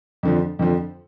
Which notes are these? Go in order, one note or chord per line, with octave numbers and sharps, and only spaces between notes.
F2 D3 F3
F2 D3 F3